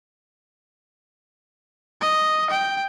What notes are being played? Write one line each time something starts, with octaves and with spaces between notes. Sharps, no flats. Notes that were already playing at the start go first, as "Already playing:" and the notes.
D#5
G5